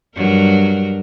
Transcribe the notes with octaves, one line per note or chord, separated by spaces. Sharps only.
G2 F#3 A#4